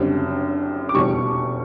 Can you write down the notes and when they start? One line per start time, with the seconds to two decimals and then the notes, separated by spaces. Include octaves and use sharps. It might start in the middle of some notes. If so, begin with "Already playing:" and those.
Already playing: F#1 F#2 D3 G3 C4
0.89 D6
0.94 F1 E2 B2 G3 C#6